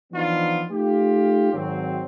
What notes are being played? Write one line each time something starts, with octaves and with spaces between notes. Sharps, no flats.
E3 F3 B3 D4 D#4 F4
A3 D#4 F4 G4
G#1 F#3 C4